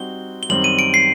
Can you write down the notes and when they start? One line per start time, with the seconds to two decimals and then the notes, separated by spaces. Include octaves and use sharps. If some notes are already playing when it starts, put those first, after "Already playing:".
Already playing: G3 C4 D#4 F#4 G7
0.43 G7
0.49 F#2 D#3 G3 C4 F#7
0.64 D#7
0.79 D7
0.94 C7